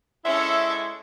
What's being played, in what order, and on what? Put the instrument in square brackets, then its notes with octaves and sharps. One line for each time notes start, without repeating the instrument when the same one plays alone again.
[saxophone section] G#3 E4 [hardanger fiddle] C#4 A4 [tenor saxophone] E5